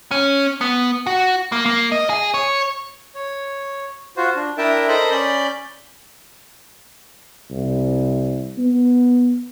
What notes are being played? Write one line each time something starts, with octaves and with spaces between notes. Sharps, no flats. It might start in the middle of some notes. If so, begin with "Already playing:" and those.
C#4
B3
F#4
A#3
A#3
D#5
G#4
C#5
C#5
F4 F#4 C5
D4
D4 E4 A#4 E5 G5 A5
A4 A#4 C5 D#5 A#5 B5
C#4 D5 B5 G6
C2
B3